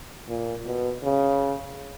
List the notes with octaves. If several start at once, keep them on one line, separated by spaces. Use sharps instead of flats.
A#2
B2
C#3